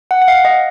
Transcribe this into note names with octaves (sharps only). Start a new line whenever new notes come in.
F#5
F#5
F5
D#5